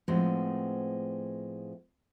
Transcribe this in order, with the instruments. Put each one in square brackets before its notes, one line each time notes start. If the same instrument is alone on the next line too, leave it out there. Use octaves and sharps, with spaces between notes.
[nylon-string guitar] A2 F3 G#3 B3 C4